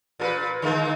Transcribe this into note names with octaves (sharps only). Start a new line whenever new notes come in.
A#2 A4 B4
D3 G#3 A#3